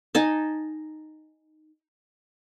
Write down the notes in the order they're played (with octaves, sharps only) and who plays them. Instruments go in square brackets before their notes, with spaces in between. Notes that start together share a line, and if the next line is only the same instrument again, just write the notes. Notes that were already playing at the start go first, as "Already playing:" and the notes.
[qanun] D#4 G#5 A5